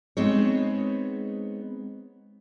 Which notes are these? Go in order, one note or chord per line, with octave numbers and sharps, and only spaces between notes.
G#3 B3 C4 D#4 G#4 C#5